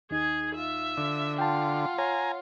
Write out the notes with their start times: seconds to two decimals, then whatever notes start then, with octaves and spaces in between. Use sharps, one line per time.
0.11 D#2 D#4 G#4 G#6
0.55 F4 E5
0.97 D3
1.39 F4 F#5 G5 A5
1.98 C#5 G#5 A#5